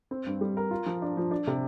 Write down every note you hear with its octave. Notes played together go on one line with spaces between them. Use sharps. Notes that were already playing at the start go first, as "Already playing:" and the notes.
C4
G2
G3
A#4
F4
F3
D4
F3
D4
C3